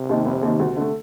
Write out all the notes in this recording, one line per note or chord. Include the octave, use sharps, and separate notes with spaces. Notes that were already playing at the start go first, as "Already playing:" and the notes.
Already playing: C3
D#2 D#3
F1
D#2 D#3
D2
D3 A3